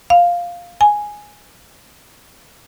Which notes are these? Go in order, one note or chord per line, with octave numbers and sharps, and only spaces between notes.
F5
G#5